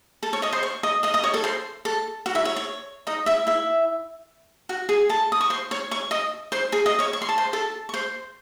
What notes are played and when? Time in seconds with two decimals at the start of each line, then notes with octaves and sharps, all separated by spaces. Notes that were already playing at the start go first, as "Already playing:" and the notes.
0.23 A4 A5
0.33 C#5 C#6
0.42 D#5 D#6
0.52 C5 C6
0.63 C#5 C#6
0.83 D#5 D#6
1.03 D#5 D#6
1.14 D#5 D#6
1.24 C#5 C#6
1.34 A4 A5
1.44 C5 C6
1.85 A4 A5
2.26 F#4 F#5
2.35 E4 E5
2.45 C#5
2.56 C#5
3.07 D#4 D#5
3.26 E4 E5
3.47 E4 E5
4.69 F#4 F#5
4.89 G#4 G#5
5.09 A4 A5
5.32 D#6
5.41 C#6
5.50 C5 C6
5.71 C#5 C#6
5.91 C#5 C#6
6.11 D#5 D#6
6.52 C5 C6
6.72 G#4 G#5
6.86 D#5 D#6
6.99 C#5 C#6
7.13 C#6
7.22 C6
7.29 A5
7.38 C5 C6
7.53 A4 A5
7.89 C#6
7.94 C5 C6